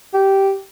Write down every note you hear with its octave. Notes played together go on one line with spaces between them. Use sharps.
G4